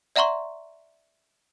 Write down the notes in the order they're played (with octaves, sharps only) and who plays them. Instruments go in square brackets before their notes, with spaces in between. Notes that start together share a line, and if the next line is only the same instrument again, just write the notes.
[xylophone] D5 E5 F#5 A#5 C6 C#6